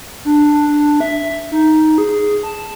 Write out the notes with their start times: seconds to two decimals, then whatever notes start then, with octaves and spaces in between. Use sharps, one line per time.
0.25 D4
0.44 D4
0.67 D4
1.01 E5
1.52 D#4
1.98 G#4
2.43 A5